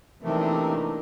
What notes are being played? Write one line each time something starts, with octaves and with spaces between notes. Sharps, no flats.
C3 E3 A3 A#3 D4 D#4 A#4